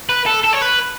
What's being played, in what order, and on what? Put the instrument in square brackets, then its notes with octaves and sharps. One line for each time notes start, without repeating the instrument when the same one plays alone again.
[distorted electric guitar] B4
A4
A4
C#5
B4